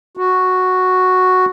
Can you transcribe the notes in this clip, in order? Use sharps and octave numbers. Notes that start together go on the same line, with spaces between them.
F#4